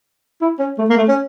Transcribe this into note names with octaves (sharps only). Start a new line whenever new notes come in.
E4
C#4
A3
A#3
A3
C#4